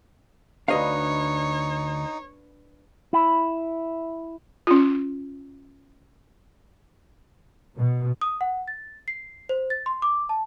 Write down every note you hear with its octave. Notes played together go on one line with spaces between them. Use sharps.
D2 D4 D#4 B4 C#5 D#5 F5
E4
C#4 F4
B2
D#6
F#5
A6
C7
C5
A6
C6
D6
A5